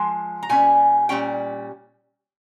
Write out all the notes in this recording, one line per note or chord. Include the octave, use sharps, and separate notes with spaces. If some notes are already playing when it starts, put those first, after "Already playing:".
Already playing: F3 G#3
A#5
A#2 G3 C#4 G#5
A#2 G3 C#4 G5